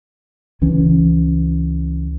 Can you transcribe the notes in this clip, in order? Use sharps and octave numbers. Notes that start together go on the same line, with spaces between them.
C#2 E3 C#4